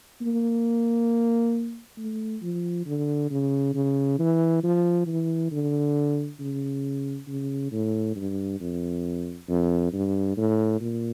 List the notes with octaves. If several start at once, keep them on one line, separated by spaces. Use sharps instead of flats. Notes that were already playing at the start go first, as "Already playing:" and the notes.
A#3
A3
F3
D3
C#3
C#3
E3
F3
E3
D3
C#3
C#3
A2
G2
F2
F2
G2
A2
A#2